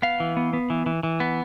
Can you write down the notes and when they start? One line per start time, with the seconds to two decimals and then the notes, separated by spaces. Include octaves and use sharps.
0.02 B3 F5
0.20 E3
0.37 B3
0.53 B3
0.70 E3
0.86 E3
1.03 E3
1.20 B3